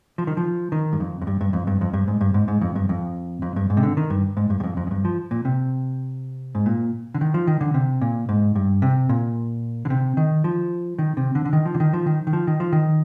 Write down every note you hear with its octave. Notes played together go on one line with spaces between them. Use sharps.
F3
D#3
F3
D#3
G2
F2
F2
G2
G2
F2
G2
F2
G2
G#2
G2
G#2
G#2
F2
G2
F2
F2
G2
G#2
C3
D3
D#3
G2
G#2
G2
G2
F2
F2
F2
G2
F3
A#2
C3
G#2
A#2
D3
D#3
F3
D#3
D3
C3
A#2
G#2
G2
C3
A#2
D3
C3
D#3
F3
D#3
C3
D3
D3
D#3
F3
D3
D#3
F3
D#3
D#3
F3
D#3
F3
D#3